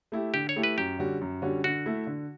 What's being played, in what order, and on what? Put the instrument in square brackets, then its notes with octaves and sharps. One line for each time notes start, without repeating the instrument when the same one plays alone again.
[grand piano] A3 E4 G4
[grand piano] D3 [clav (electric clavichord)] G4
[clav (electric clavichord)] C#5
[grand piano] A3 E4 G4
[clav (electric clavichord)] B4
[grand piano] F#2 [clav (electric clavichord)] G4
[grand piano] D3 G3 C#4 F#4
F#2
D3 G3 C#4 F#4
[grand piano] D3 [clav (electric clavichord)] F#4
[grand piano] A3 E4
D3